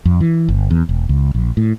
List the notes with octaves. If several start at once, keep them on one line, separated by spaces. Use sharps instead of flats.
F2
E3
G1
E2
E1
C#2
A#1
A2